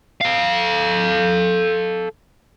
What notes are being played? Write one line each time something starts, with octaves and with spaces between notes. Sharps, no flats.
A4 F5